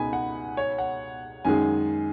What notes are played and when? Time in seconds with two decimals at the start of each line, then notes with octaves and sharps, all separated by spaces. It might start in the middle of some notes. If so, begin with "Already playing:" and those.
Already playing: C#2 B2 B3 D#4 G#4 G#5 B5
0.13 F#5
0.57 C#5
0.78 F#5
1.45 F#2 D#3 G#3 G#5